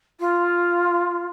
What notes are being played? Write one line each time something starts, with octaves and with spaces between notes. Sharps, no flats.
F4